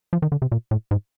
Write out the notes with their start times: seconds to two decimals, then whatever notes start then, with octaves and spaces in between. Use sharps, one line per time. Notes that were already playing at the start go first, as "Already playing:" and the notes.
0.13 F3
0.22 D#3
0.32 D3
0.42 C3
0.52 A#2
0.71 A2
0.91 G#2